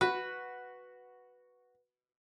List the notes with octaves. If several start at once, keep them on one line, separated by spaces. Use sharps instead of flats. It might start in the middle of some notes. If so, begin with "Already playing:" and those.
F#4 B4